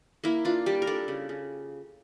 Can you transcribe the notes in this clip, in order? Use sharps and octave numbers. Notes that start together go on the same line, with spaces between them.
A#3 E4
D4 F4
G3 G4
A#4
D4 A4
C#3
C#3